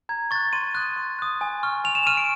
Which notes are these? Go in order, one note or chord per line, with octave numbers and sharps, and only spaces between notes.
A#5 G#6
C#6 F#6 A6
C6 D#7
D#6 F#6
C6
D#6 F#6
G#5
C#6 F6
G#5 F7
E7
C#6 F6 D#7
D7